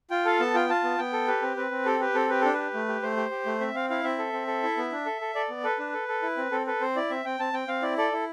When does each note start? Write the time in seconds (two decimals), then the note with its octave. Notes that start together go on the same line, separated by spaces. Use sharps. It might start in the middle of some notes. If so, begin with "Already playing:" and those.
0.11 F4 G5
0.25 A4 F5
0.40 B3 A5
0.54 F4 G5
0.69 F4 A5
0.83 B3
0.98 B3 G5
1.13 A4
1.28 G4 B4
1.42 C4
1.57 C4 B4
1.71 C4
1.85 G4 A4
2.00 G4 B4
2.15 C4 A4
2.29 G4 B4
2.41 D4 A4
2.53 G4 B4
2.74 A3
2.88 G4
3.02 A3 C5
3.17 G4
3.31 G4
3.46 A3
3.60 C4 E5
3.74 C4 F5
3.90 E4 F5
4.04 C4 E5
4.18 A4
4.33 C4
4.47 A4
4.63 E4
4.77 B3
4.92 D4
5.06 A4
5.21 A4
5.35 A4 D5
5.50 B3
5.64 A4 B4
5.79 D4
5.93 A4
6.08 A4
6.23 E4
6.37 C4
6.51 C4 A4
6.67 A4 B4
6.81 C4 C5
6.96 E4 D5
7.10 C4 E5
7.25 C4 G5
7.40 C4 A5
7.53 C4 G5
7.68 C4 F5
7.82 E4 D5
7.98 A4 D5
8.12 E4